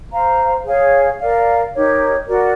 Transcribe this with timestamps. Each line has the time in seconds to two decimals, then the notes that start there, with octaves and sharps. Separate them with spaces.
0.11 C5 F5 A#5
0.65 G#4 C#5 F5 G#5
1.19 A#4 D5 F5
1.73 D#4 G4 A#4 C#5
2.27 F#4 A#4 D5